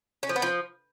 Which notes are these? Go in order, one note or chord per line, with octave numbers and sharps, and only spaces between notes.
C#4
F3
B3
F3